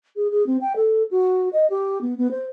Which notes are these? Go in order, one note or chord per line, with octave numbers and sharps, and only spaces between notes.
G#4
G#4
C4
G5
A4
F#4
D#5
G4
B3
B3
C5